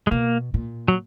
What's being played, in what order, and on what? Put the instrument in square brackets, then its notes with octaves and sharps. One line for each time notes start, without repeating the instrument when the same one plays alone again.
[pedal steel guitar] G#3
[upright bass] B2 [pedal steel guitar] A#3
[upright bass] A#2
[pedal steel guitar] F#3